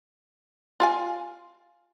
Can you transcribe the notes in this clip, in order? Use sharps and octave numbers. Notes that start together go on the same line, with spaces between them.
F4 F5 G#5